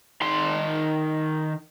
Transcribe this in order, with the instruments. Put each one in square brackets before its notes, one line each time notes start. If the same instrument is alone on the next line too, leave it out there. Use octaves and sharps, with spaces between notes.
[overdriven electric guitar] D#3 C6